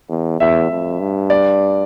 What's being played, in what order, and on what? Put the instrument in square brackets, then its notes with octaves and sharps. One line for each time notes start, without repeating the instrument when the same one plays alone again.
[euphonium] E2
[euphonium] E2 [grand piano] E5
[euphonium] F2
G2
[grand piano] D5